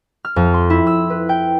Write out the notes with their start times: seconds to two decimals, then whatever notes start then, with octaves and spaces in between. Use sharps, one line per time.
0.25 F6
0.36 F2
0.54 C6
0.70 E4
0.87 E6
1.10 B4
1.29 G5